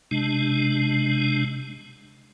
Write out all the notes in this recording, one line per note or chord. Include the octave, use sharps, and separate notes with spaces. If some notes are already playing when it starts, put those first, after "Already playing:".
C3 G#3 D4